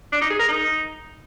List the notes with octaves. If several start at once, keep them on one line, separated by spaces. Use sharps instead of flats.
D4
D#4
G#4
A#4
D#4